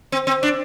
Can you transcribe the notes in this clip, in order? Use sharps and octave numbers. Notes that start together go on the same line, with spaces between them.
C4
C4
D4